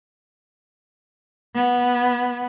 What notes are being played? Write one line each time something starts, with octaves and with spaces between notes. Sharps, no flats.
B3